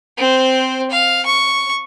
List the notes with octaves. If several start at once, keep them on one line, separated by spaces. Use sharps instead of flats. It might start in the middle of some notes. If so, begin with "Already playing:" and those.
C4 C5
F5
C#6